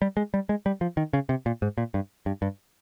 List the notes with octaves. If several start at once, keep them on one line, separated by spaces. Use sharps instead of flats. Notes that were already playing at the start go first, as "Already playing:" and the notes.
G3
G#3
G3
G#3
G3
F3
D#3
C#3
C3
A#2
G#2
A#2
G2
G2
G2